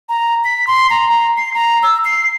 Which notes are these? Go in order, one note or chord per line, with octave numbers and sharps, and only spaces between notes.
A#5
B6
C6
A#5
A#5
C7
A#5
E6
C7